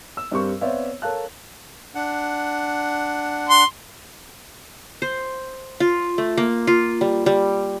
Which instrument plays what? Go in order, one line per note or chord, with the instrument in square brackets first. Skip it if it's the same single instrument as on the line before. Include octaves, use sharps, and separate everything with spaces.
[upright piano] E6
G2 G3 C4 A#4 C#6
B3 C4 C#5 D5 E5 F5
A4 A#4 C#5 F5 A5 F#6
[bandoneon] D4 F#5
[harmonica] C6
[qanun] C5
F4
A3
A#3
F4
G3
G3